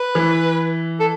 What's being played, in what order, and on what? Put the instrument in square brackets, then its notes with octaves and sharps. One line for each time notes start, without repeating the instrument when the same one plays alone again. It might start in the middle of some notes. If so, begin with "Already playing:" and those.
Already playing: [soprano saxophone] B4
[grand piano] E3
[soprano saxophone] A4